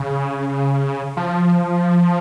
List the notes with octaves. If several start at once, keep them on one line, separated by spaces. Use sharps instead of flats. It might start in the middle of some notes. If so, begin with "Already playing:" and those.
Already playing: C#3
F3